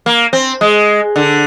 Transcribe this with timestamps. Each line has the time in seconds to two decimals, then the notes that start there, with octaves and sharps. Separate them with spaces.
0.06 A#3
0.33 C4
0.61 G#3
1.16 D3